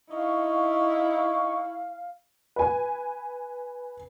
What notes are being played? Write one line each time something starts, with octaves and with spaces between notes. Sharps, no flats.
D#4 E4 F5 C#6
B4 G#5